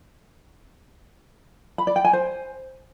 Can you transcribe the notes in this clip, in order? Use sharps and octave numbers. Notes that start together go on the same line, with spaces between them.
B5
D5
G5
G#5
C5